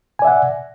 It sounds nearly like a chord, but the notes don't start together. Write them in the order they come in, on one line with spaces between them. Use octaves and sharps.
G#5 D5 E5 F#5